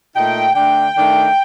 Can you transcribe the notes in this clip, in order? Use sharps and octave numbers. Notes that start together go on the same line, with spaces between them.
A#2 A3 D#4 G5
D3 A3 D4 G5
D#3 A3 D4